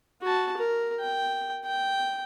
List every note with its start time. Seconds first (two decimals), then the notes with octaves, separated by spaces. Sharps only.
0.22 F#4 A5
0.57 A#4
1.00 G5
1.65 G5